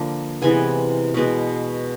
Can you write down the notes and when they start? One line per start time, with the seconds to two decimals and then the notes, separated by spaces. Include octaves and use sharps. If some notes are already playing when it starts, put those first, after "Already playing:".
Already playing: D3 F3 A#3
0.42 C3 E3 G#3 B3 G#5
1.14 B2 G#3 B3